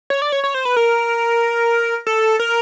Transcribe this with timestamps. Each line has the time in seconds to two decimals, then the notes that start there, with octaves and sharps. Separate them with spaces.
0.10 C#5
0.22 D5
0.32 C#5
0.44 C#5
0.54 C5
0.65 B4
0.76 A#4
2.07 A4
2.39 A#4